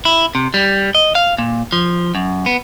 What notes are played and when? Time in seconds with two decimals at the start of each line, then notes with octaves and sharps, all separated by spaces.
0.05 E4
0.35 C3
0.54 G3
0.95 D#5
1.15 F5
1.38 A#2
1.72 F3
2.15 F#2
2.46 B3